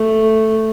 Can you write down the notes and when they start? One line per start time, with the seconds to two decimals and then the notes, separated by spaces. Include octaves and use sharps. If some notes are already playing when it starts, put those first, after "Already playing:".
Already playing: A3